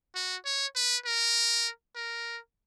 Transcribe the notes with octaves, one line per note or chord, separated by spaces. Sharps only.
F#4
C#5
B4
A#4
A#4